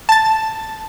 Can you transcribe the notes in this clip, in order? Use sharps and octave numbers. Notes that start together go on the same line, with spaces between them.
A5 A6